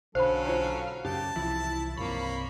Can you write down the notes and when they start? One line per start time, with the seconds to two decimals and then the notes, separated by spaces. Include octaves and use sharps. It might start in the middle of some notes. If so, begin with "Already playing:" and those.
0.15 B1 D3 F#3 C#4 A4 C5 F5 B5
0.45 F4 C#5 A#5
1.05 F#2 C#3 C#4 G4 A5
1.36 C2 E3 F3 E4
1.97 C2 G2 C3 A#3 C#5 B5